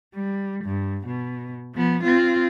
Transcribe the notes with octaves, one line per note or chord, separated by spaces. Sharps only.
G3
G2
B2
F3 B3
C4 F4